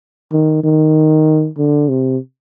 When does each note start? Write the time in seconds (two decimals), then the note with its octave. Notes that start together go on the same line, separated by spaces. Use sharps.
0.32 D#3
0.63 D#3
1.58 D3
1.89 C3